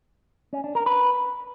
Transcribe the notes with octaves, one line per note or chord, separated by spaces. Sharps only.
C#4
D4
A#4
B4